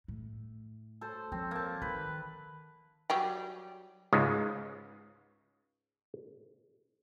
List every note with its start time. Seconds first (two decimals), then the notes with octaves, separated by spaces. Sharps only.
0.08 A2
1.01 A4 C5
1.32 F3 C4
1.51 A#3 A5
1.82 D#3 B4
3.10 F#3 G3 G4
4.13 C#2 G#2 C#3 G#3